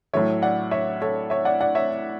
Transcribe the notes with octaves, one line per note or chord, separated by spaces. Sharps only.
A2 F#3 A3 C#5 E5
D5 F#5
C#5 E5
A4 C#5
C#5 E5
D5 F#5
D5 F#5
C#5 E5